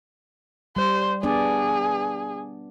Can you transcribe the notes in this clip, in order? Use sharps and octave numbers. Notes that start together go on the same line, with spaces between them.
G3 C5
B3 D4 G#4 D5